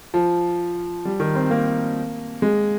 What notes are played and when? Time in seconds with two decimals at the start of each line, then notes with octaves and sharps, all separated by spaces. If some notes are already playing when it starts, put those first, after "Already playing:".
0.14 F3
1.05 G3
1.20 D#3
1.35 C4
1.51 A#3
2.42 G#3